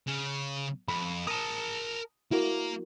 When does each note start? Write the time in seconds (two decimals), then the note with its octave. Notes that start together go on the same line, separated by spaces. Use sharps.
0.07 C#3
0.88 F2 B5
1.27 A#4 A5 D#6
2.31 A#3 E4 F#4 A#4